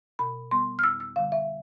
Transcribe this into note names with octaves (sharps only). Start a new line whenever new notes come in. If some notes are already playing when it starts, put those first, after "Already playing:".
B2 B5
G3 B3 C6
F6
F2 E6
E6
D3 G3 F5
E5